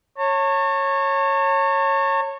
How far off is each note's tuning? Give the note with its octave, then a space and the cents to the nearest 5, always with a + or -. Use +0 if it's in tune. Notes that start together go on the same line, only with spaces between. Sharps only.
C#5 -15 A5 +40